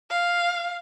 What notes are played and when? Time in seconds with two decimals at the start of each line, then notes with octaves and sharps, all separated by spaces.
0.10 F5